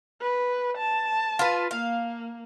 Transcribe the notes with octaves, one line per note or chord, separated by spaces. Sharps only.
B4
A5
F4 B4
A#3 F5